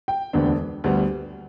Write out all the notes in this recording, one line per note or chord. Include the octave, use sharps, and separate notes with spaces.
G5
E1 D2 D3 B3 D4
D2 D3 G3 B3